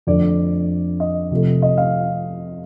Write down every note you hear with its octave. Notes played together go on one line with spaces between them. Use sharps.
F2 D3 A3 D5
D#5
C3 F3 A3
D#5
F5